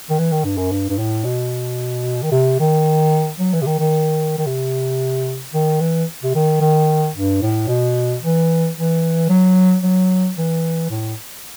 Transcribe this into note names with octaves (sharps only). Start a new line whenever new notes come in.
D#3
E3
D#3
G2
F#2
G2
G2
A2
B2
D#3
C3
D#3
F#3
E3
C3
D#3
D#3
D#3
C3
D#3
E3
C3
D#3
D#3
G2
A2
B2
E3
E3
F#3
F#3
E3
A2